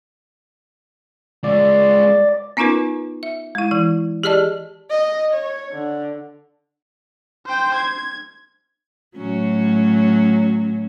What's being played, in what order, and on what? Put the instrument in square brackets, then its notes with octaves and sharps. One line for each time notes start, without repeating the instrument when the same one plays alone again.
[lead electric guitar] G#3 F4 [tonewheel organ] D5
[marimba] B3 C#4 D#4 F4 A#4 B4
E5
G#3 E4
E3 E4
G4 G#4 D5 D#5 A5
[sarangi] D#5
C#5
D3
[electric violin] C5 G5
G#6
[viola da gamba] A2 F#3 C#4